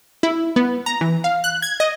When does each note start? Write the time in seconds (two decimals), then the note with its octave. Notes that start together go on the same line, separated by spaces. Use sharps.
0.23 E4
0.56 B3
0.86 A#5
1.01 E3
1.24 F5
1.44 F#6
1.62 G#6
1.80 D#5